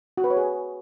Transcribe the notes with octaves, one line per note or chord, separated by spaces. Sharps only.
F#4
B4
C#5
G#4